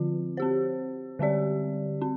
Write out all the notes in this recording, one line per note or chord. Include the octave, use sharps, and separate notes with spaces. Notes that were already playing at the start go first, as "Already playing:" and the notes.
Already playing: D3 F3 C4 F4
C4 G4 C5
D3 G3 C4 G4 D5
C4